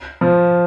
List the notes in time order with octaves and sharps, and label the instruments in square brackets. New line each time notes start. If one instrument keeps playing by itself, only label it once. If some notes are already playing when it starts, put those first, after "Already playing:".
[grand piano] F3